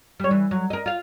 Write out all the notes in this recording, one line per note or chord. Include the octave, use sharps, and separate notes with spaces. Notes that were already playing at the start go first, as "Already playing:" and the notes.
G3 C#5
E3
F#3
A#4 D#5
F4 F5